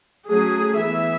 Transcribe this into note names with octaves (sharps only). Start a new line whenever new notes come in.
F#3 A3 C#4 G#4
E3 B3 E5